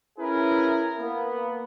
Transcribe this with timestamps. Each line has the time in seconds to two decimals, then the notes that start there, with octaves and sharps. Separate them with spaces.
0.18 C#4 E4 G#4 A#4 B4
0.99 A#3 B3